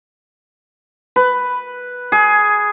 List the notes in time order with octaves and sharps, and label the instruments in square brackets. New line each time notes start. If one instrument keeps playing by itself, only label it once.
[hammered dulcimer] B4
G#4